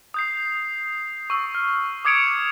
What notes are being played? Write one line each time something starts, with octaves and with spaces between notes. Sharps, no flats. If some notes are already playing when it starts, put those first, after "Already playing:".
D#6 G6 C7
C#6 E6
F6
D6 D#6 G#6 C#7 D7 F7